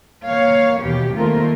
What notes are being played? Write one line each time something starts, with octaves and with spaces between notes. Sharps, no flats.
A#3 C#5 F5
D#2 B2 E3 G4
D#3 A3 A#3 C4 F4 A#4